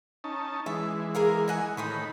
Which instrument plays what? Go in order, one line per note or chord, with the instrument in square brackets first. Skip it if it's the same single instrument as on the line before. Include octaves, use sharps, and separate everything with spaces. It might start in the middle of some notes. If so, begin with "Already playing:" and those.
[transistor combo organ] C#4 D#4 A5
[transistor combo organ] E3 G#3 [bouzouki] E5
[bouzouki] G#4 A#4 F5
D#5 F#5 G#5
[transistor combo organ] A2 D#3 B5 [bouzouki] D#4 C5 C#5